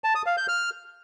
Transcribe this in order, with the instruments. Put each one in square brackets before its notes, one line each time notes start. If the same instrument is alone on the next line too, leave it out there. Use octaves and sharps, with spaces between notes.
[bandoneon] A5
D#6
F5
G6
F6